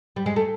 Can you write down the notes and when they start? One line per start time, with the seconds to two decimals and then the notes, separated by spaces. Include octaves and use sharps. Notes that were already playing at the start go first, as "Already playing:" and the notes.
0.16 G3
0.26 G#3
0.36 A3